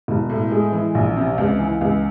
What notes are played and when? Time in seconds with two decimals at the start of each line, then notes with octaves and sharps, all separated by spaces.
0.08 E1
0.30 A2
0.51 G#3
0.73 E3
0.95 A#1
1.16 C3
1.38 C#2
1.59 E3
1.81 C#2